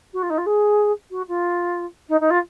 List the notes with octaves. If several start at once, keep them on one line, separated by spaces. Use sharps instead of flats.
F#4
F4
D#4
F4
G#4
F#4
F4
D#4
D#4
F4